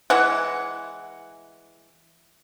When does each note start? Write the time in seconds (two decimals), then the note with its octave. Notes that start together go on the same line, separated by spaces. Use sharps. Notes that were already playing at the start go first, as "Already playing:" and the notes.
0.10 E3 G#3 F#5